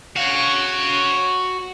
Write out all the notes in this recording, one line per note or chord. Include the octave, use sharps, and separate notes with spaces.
F#4 C#5 F5